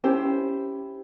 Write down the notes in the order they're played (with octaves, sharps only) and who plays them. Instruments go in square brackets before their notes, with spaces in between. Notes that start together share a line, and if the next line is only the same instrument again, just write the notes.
[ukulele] C#4 E4 G4 C5